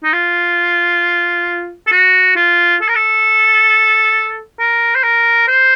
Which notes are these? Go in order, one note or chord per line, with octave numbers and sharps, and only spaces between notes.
D#4
F4
A4
F#4
F4
A4
A#4
A4
A#4
C5
A#4
C5